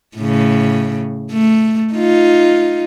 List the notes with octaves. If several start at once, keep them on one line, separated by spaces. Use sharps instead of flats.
A2 C#3
A3
D#4 F4